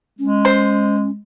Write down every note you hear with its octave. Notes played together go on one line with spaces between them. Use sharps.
G#3 C#4
C5